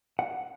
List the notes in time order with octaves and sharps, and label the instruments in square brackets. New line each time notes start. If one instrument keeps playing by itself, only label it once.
[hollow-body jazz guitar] F#5